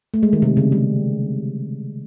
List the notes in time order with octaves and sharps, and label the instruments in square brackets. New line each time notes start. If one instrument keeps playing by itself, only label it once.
[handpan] A3
G#3
D#3
C3
C#3
G3